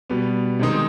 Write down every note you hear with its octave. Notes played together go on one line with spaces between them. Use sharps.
B2 G3 B3
C3 D#3 G#3 C4 D#4